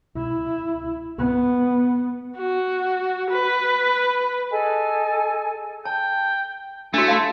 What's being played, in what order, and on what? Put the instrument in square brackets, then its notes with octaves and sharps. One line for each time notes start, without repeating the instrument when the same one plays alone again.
[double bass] E4
B3
[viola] F#4
B4
[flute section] G#4 A4 D#5 G#5
[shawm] G5 [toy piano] A5
[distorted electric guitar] A3 [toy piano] D4 F#4 [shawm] E4
[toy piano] F5 A5 C6